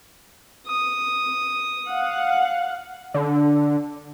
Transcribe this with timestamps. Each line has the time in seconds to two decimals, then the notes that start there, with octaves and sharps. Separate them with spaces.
0.67 D#6
1.89 F5 F#5
3.14 D3